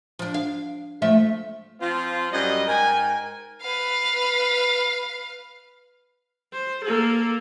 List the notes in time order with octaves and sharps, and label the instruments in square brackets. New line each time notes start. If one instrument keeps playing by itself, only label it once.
[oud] F3 D4
F5
F3 A3 E5
[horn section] F3 C4 F4
F#2 G3 D#5
G#2 A#4 G5 G#5
[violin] B4 F5
[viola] C5
A#3 A4